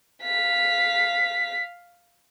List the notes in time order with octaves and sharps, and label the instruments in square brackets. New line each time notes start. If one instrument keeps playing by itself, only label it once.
[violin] F5 B6